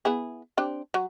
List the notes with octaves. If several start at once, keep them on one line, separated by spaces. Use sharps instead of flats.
B3 E4 G#4
C4 D4 G4
F#3